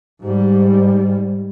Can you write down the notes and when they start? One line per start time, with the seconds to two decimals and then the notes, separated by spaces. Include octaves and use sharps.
0.22 G#2 G3